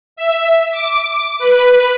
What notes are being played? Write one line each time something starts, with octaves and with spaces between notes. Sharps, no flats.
E5
D6
B4